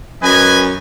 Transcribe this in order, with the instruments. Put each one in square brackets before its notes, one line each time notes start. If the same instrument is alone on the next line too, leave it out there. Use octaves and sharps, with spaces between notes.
[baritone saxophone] F#2 [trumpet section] B4 D#5 G#5